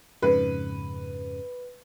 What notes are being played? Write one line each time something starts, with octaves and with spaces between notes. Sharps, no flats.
F2 G#2 C#3 B4